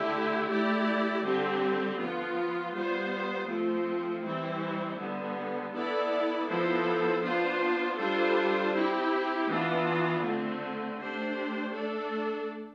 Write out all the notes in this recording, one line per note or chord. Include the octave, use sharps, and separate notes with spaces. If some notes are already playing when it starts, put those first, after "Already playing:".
Already playing: D3 A3 E4 G4
A3 E4 G4 D5
D3 G3 C4 G4
F3 B3 F4
G3 B3 F4 C5
F3 A3 C4 F4
E3 G3 C4 E4
D3 G3 B3
B3 E4 A4 D5
F3 B3 E4 A4 C5
B3 D4 F4 C5
G3 D4 F4 A4 C5
C4 E4 G4
E3 B3 D4 F4
D3 A3 C4
A3 D4 G4 C5
A3 D4 A4 D5